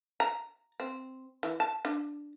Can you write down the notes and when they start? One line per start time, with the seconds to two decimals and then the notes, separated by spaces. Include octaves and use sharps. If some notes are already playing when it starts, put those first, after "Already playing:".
0.20 A#5
0.80 C4
1.43 E3
1.60 A5
1.85 D4